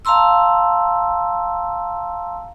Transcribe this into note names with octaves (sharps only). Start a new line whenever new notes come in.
F5 A5 A#5 C6 E6